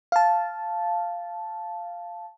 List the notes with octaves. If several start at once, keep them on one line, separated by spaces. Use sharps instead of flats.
F5 A5